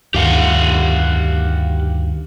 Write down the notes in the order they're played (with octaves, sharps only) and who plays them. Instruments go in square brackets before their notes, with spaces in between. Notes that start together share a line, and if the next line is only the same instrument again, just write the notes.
[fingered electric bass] D2 G2 D#3 [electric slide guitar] G4 F5 F#5